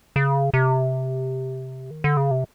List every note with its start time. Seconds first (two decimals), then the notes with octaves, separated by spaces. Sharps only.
0.16 C#3
0.54 C3
1.91 D#3
2.04 D3
2.17 C#3
2.31 C3